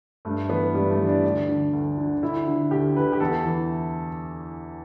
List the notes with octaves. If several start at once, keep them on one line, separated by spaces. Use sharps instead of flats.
G2 A3
E3 B3
G2 G3
A3
E3
D4
D2 D4
D3
D2
D3
D2 E4
D3
D2 G4
D3 B4
G4
E2 A4
E3